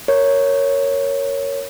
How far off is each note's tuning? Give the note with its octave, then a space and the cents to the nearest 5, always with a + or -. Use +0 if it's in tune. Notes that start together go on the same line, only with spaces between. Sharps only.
A#4 -10 C#5 +0